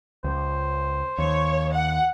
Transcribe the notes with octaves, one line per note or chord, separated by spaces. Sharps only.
C#2 C5
D#2 C#5
F#5